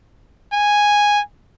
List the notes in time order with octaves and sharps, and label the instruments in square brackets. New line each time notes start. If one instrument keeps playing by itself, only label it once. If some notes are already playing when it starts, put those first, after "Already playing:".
[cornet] G#5